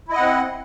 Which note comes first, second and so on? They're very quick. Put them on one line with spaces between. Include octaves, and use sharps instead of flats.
E4 D#5 F#5 C4